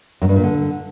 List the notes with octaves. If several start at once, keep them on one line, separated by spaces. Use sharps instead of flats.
F#2
G2
A#2
D3